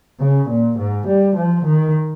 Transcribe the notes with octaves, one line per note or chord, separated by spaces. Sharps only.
C#3
A#2
G#2
G3
F3
D#3